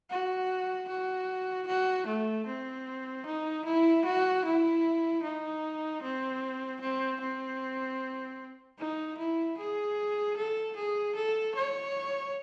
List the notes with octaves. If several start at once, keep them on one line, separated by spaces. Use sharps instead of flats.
F#4
F#4
F#4
A3
C4
D#4
E4
F#4
E4
D#4
C4
C4
C4
D#4
E4
G#4
A4
G#4
A4
C#5